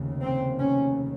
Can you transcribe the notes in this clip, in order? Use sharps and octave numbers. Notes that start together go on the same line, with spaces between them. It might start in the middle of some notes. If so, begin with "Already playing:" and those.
Already playing: F1 D#2 C#3
C4
C#4